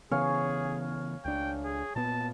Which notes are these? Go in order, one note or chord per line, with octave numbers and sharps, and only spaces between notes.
C#3 E3 B3 G#4 C#5 F5 G#5
C#2 D4 G5
G#4
A#2 B3 A5